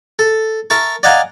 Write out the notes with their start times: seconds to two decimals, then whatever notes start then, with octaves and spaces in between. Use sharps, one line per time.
0.19 A4
0.70 A#4 E5 A5 C#6
1.03 D5 D#5 F5 F#5 G#5 A#5